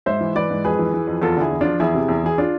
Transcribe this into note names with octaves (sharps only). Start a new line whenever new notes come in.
G#2 C5 E5
E3
E3 B4 D5
G#2
F2 G#4 B4
E3
E3
F2
E2 F4 A4
D3 E4 G#4
E2
F3 D4 F4
E2 E4 G#4
C3
E2
E3 G#4
D4 F4